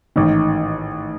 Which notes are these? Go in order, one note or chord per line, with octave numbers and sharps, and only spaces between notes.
A1 G#2 D#3